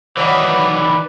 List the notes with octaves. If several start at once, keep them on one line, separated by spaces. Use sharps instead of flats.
D#3 E3 F#3 B4 D5